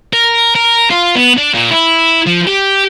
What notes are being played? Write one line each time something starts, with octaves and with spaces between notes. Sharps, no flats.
A#4
A#4
F4
B3
D4
A#2
E4
F3
G4